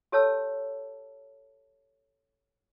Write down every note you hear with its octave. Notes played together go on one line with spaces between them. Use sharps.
G4 A4 C#5 A5 E6